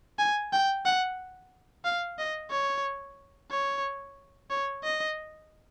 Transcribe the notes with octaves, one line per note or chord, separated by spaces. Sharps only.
G#5
G5
F#5
F5
D#5
C#5
C#5
C#5
D#5